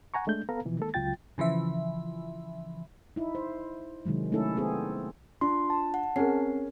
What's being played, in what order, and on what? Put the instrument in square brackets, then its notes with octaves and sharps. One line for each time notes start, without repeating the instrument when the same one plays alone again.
[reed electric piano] F#5 G#5 A#5 C#6
G#3 A3 D4 G6
B3 A4 B4 F5 A#5
B2 E3 F3
D#3 G#3 A#3 A4
C#2 F#3 F4 G5 A6
[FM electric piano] C#3 E3 F3 E5
[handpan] D#4 E4
C5
C3 D#3 F#3 G#3
A3 C#4 D#4 E4 A4
B3 C4 G#4 A4
[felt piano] D4 [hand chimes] F4 [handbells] C6
[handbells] A5
[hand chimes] F#5
[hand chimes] C4 C7 [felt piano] C#4 G#4 A#4